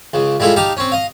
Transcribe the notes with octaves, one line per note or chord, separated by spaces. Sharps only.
C#2 C#3
G3 G#3 E4 F4 A4
D#4 G4 F5 A5
C4 C#4
D#5 F5